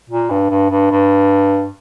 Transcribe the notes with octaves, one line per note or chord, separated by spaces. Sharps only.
A#2
G2
G2
G2
G2